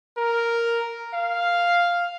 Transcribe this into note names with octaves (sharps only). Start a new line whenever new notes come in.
A#4
F5